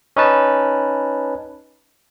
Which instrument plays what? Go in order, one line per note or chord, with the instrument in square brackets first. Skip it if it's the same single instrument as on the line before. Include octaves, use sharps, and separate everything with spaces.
[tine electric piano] C#4 D#4 B4 A5